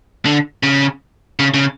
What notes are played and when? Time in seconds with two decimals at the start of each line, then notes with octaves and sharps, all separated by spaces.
0.25 D3
0.63 C#3
1.39 C#3
1.54 C#3